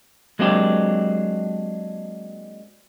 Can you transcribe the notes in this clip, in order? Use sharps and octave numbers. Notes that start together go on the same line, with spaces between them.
F#3 G#3 A#3 C4 D4 G4